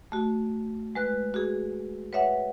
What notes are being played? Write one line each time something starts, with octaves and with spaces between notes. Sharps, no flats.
A3 F#4
G#3 B4 F#6
F#4 G#4
B4 C#5 E5 F#5